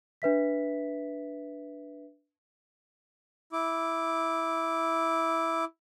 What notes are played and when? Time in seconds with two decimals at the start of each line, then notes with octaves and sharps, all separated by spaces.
0.22 D4 B4 E5 B6
3.53 E4 D6